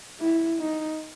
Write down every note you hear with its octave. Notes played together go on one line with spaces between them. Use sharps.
E4
D#4